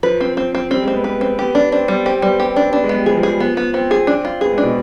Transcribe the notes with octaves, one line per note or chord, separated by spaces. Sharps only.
F3 B4
C4
C4
C4
G3 C4
G#3
C4
B3
B4
C4
B3 G4
B3 D4
C4 D4
G3 B3
C4 G4
G3 B3
B3 G4
C4
D4
C4
B3 D4
G#3
B3
G3
F3 G#4
F3
G#4
G3
F3 B3
B3
B3 C4
G#4
D4
F4
B3 G#4
G#3
D4
B2